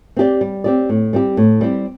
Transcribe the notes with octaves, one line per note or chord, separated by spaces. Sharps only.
C4 G4 D5
G3
C4 G4 D5
A2
G3 C4 G4
A2
G3 C4 G4